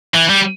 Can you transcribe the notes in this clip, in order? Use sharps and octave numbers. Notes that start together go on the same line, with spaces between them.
E3
G3